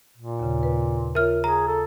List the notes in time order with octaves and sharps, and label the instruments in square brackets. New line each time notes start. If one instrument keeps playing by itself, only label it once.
[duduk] A#2
[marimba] D#2 C#3
B4
[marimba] F4 C#5 E5 [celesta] A#4 F6
[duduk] G#4 [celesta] A#5
[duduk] A4